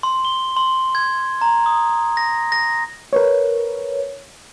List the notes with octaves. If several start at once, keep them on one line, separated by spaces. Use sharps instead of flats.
C6
G7
C6
G#6
A#5
D#6
A#6
A#6
A#4 B4 C#5